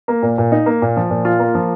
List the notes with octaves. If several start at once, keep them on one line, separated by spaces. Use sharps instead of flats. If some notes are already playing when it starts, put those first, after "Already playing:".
A#3
A#2
A#2
D#4
A#3
A#2
F3
A#2
F4
A#3
F3